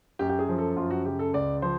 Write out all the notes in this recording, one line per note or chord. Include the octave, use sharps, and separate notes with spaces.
F#2 G4
G4
G#4
F3
A4
F#2 F4
F#4
C#3 G4
A4
C#2 D5
F3 C5